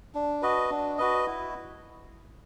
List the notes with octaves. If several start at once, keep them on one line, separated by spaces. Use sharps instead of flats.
D4
F#4 B4 D#5
D4
F#4 B4 D#5
E4